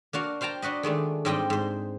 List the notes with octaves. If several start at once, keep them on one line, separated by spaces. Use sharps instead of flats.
A#3 D4 F#4 F5
C5 F5 G5 A5 A#5
D4 F#4 B4 D#5
D#3 G#3 A3 D4
G#2 G3 C4 D4 D#5 G5
G#2 C5